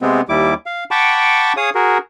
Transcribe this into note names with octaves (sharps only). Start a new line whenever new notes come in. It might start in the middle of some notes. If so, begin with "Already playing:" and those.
C3 G#3 B3 C4
D#2 G3 E4 D6
F5
F#5 G5 A5 B5 C#6 D6
G#4 C#5 F5 D#6
F#4 G#4 A#4